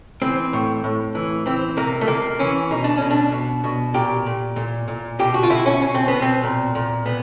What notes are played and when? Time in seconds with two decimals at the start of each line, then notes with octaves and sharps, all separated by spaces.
0.22 E3 C4
0.53 A2
0.84 A2
1.15 E3
1.46 E3 C4
1.77 C3 A#3
2.01 A3
2.08 C3 A#3
2.39 E3 C#4
2.71 B2 D#4
2.84 D4
2.97 B2 C#4
3.11 D4
3.32 B2
3.64 B2
3.94 A#2 G4
4.26 A#2
4.56 A#2
4.88 A#2
5.19 B2 G4
5.34 F#4
5.43 F4
5.50 B2 E4
5.66 C#4
5.81 B2 C#4
5.95 C4
6.08 B2 B3
6.22 C4
6.43 A#2
6.75 A#2
7.05 A#2 B3